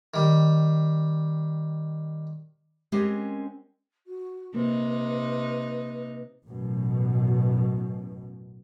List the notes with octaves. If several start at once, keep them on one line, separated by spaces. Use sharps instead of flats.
D#3 G3
G#3 C4 C#4 G4 A#4
F#4
C3 A#3 D#4 B4
A1 F#2 B2